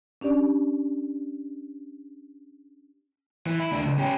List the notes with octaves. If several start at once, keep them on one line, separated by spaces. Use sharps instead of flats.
C#4 D4 G4 D5
E3
E4
D#2 D4
C#2
C#4 G4